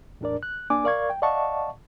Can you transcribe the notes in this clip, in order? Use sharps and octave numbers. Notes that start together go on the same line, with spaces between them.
E2 A2 D4 A#4 D5
F#6
A#3 D4 D5 G#5 D6
A#4 D5 F5 C#6 G#6
G5
D5 D#5 F5 F#5 A5 C#6